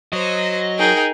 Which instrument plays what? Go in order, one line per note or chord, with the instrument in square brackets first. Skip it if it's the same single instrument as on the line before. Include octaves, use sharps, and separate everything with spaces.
[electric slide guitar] F#3 [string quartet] C5 [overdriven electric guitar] D#5
[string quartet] D#4 G#4 A#4 [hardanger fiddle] G5